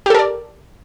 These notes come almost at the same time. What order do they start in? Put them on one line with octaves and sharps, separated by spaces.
G4 A4 A#4 D5